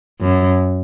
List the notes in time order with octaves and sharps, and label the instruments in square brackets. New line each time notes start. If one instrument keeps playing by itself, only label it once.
[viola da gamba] F#2